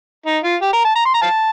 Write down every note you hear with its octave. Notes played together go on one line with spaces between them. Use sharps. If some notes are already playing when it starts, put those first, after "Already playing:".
D#4
F4
G4
A#4
A5
A#5
C6
A#5
F5 A5